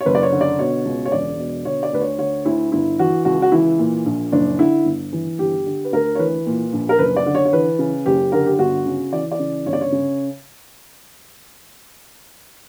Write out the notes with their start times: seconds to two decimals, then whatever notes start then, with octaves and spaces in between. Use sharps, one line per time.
0.01 C#5
0.06 F#1 B4
0.15 D5
0.23 C#5
0.32 D3
0.41 D5
0.59 B2 C#5
0.85 C#2
1.06 C#5
1.12 E1 D5
1.39 B2
1.65 D3 C#5
1.83 D5
1.93 D2 B4
2.01 C#5
2.18 D3 C#5
2.45 D2 E4
2.72 G1 E4
2.99 E3 F#4
3.25 C#2 F#4
3.42 F#4
3.52 E3 E4
3.79 A#2
4.06 A#1
4.32 F#1 D4
4.59 D3 E4
4.85 G1
5.13 E3
5.39 G1 G4
5.66 D3
5.85 B4
5.92 D2 A#4
6.15 C#5
6.19 E3 B4
6.46 A#2
6.73 A#1
6.89 A#4
6.99 F#1 B4
7.16 D5
7.26 D3
7.35 C#5
7.45 C#5
7.53 E3 B4
7.79 C#3
8.05 F#1 G4
8.32 D3 A#4
8.46 G4
8.59 G1 F#4
8.86 C#3
9.12 E3 D5
9.32 D5
9.39 C#3
9.66 G1 C#5
9.73 D5
9.81 C#5
9.92 C#3